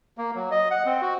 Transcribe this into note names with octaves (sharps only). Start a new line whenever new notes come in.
A#3
F#3
D#5
F#5
C4
F#4